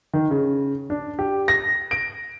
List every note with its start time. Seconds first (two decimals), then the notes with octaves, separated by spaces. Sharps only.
0.14 D#3
0.31 C#3
0.90 D4
1.19 G4
1.48 A#6
1.91 D7